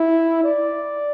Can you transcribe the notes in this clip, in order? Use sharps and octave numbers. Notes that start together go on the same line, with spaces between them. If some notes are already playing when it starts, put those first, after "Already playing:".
Already playing: E4
D5